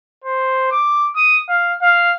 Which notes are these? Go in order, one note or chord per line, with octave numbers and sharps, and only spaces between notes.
C5
D6
D#6
F5
F5